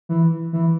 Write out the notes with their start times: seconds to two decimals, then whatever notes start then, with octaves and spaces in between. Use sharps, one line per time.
0.09 E3
0.53 E3